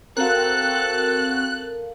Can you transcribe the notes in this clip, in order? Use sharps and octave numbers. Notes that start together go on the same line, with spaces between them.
C4 F#4 A4 A#4 F5 F#6